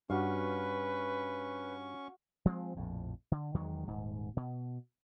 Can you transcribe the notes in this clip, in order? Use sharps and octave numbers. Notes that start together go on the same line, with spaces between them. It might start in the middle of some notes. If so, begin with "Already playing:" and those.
G2 C#4 F#4 B4 F5 C#6
F3 G#3 B3 C4
A#1 F2 A2
D3
E2 D#3 F#3 G#3
D#1 G#2
B2